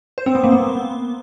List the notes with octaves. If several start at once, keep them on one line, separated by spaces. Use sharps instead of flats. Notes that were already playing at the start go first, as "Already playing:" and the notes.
C5
C4
B3
A#3
B3